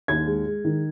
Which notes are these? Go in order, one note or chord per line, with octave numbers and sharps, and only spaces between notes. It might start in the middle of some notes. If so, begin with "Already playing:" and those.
D#2 G#6
G#3
G#3
D#3